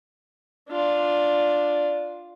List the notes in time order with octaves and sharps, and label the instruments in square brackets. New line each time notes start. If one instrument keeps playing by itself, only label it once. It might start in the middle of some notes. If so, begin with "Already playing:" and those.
[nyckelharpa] D4 F4